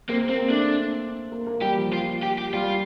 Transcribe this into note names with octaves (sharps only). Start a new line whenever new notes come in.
A#3 C4
A#3 C4
A3 D4
A#3
A#3
G3 G4
F3
F4
G4
G4
G3 F4